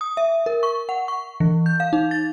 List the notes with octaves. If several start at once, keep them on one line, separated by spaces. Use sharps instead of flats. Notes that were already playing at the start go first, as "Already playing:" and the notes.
D#6
E5
A#4
C#6
F#5
C#6
E3
G6
F5
D#4
A6